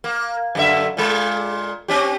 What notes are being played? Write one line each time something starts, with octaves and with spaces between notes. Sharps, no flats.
A#3
F#2 D3 E5
A#2 G#3
C4 C#4 G4